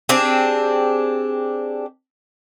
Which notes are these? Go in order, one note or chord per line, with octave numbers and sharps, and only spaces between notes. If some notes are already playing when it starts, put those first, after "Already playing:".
C4 D4 G4 G#4